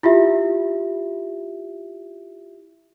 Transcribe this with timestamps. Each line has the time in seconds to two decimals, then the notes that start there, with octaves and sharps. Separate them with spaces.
0.03 E4 F4 G4 E5